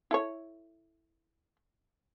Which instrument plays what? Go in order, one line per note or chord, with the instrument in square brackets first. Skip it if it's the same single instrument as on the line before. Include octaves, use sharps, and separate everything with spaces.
[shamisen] E4 A4 C#5